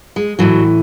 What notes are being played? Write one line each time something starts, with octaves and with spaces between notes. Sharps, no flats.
G#3
A2 E3 F#3